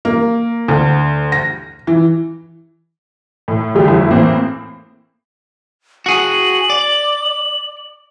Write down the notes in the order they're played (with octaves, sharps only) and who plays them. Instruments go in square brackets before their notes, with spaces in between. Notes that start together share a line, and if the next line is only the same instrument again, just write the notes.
[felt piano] A#3
D2
A#6
E3
[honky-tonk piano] A2
D3 G3 A3 G4 G#4
G1 F2 E4
A2 E3 A#3 C4
[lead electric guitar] F#4 G#4 [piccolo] F#7
[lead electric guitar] D5